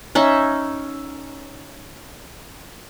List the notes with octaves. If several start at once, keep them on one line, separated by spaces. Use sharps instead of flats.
C#4 D#4 E5